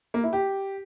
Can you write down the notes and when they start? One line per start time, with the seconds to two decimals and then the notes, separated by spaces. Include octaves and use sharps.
0.14 A#3
0.23 E4
0.33 G4